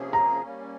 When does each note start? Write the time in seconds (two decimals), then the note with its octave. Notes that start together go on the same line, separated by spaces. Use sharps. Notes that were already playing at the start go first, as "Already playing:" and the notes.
Already playing: C3 F3 A#3 C#4 G#4
0.13 A#5
0.42 G3 A#3 C#4